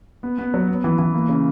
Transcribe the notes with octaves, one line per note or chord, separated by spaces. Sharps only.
B3
B3
F#3
B3
E3
E3
A#3
C#3